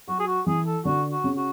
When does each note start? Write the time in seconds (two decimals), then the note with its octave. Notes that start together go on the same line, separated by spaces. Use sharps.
0.08 F#3 F#4
0.20 G#4
0.27 F#4
0.46 E3 G#4
0.66 A4
0.85 D3 F#4
1.11 F#4
1.24 C#3
1.37 F#4